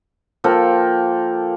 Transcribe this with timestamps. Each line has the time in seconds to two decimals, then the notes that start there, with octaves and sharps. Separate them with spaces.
0.44 F3 A#3 A4 G5